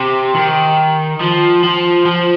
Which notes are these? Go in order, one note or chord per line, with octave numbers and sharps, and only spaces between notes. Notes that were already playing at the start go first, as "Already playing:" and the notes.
Already playing: C3
D#3
F3
F3
F3